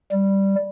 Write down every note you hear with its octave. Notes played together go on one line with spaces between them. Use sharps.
G3